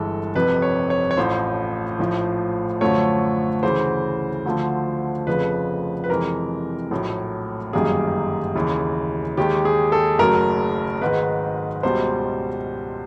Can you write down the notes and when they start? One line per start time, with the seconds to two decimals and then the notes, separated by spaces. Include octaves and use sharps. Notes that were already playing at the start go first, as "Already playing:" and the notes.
Already playing: G1 G2 E3 G#3 A4
0.35 F1 F2 C3 B4
0.62 C#5
0.90 C#5
1.11 C#5
1.17 A1 A2 F3 C5
1.99 A#1 A2 F3
2.81 F#2 D3 F3 A3 C#5
3.63 D2 C#3 E3 C5
4.46 D2 D3 F3 A3
5.27 F1 F2 C#3 F3 B4
6.04 B4
6.09 F2 C3 E3 G#3 A#4
6.91 A#1 A2 F#3
7.73 G1 F#2 D#3 G3 A#3 G#4
8.55 D#2 C#3 E3
9.37 D#2 D#3 G#3 G4
9.65 G#4
9.92 A4
10.19 F#1 F#2 C#3 F#3 A3 A#4
11.01 G#1 G#2 D#3 G#3 B4
11.83 C#2 B2 G3 C5